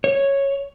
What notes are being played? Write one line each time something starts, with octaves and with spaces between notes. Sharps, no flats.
C#5